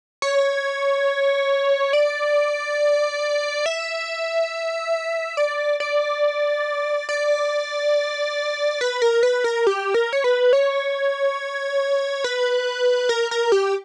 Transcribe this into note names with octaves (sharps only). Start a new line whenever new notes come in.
C#5
D5
E5
D5
D5
D5
B4
A#4
B4
A#4
G4
A#4
C#5
B4
C#5
B4
A#4
A#4
G4